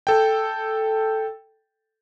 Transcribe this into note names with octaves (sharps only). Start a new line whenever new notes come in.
A4 G5